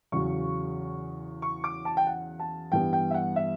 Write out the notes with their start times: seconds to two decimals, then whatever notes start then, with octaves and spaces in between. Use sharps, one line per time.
0.12 E2 C#3 F#3 C#6
1.42 C#6
1.64 D6
1.85 A5
1.97 G5
2.07 F#5
2.39 A5
2.72 G2 E3 G3 B3 G5
2.93 G5
3.11 E5
3.14 F#5
3.36 E5